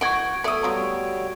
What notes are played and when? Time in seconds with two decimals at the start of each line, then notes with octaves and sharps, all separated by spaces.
0.01 E3 F#4 D#5 C#6 G#6 D7
0.44 F#3 A3 B3 D5 D#6
0.63 G3 B3 F4 F#4 C#5 A#5